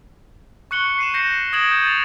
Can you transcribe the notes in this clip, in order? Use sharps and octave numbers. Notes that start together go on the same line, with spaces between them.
C#6 F#6 C#7 F#7 G7
C7 D#7 E7
G6 A#6 C#7
D#6 G#6 D7 E7 F#7
G6 D#7
A6 E7 F7